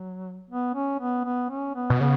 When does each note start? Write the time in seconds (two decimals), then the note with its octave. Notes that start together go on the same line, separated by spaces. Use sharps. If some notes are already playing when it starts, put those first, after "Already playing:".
Already playing: F#3
0.50 B3
0.75 C#4
1.00 B3
1.24 B3
1.50 C#4
1.75 B3
1.90 B2
2.00 C#3 B3